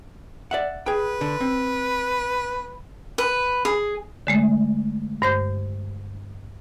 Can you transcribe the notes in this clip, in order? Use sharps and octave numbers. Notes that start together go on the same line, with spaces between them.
D5 E5 F#5
G#4 B4 G5
D3
C4
B4
G#4
D3 G#3 A3
G2 C5 G6